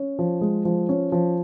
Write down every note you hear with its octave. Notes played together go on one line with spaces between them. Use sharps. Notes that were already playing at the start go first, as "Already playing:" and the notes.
Already playing: C#4
F3
G#3
F3
C#4
F3